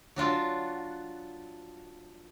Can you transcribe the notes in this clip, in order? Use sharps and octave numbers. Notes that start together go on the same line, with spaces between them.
F#3 D4 F4 F#4